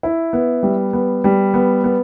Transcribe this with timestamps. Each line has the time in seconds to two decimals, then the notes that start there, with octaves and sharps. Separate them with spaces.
0.03 E4
0.33 B3
0.63 G3
0.93 B3
1.24 G3
1.54 B3
1.84 B3